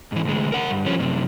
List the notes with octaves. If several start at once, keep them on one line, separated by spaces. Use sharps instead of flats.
G#2 E3
D2 G#3
A#4 F#5
G2
F3 C#4
F#2 C3